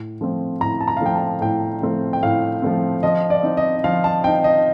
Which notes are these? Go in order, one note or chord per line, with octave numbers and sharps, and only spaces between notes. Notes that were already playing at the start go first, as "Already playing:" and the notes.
Already playing: A2
F3 A3 C4
A2 A#5
A5
A#5
F5
F3 A3 C4 G5
A5
A2 G5
F3 A3 C4
G5
A2 F5
F3 A3 C4
F3 D#5
D5
C4 D#4
D#5
F3 F5
A5
C4 D#4 G5
D#5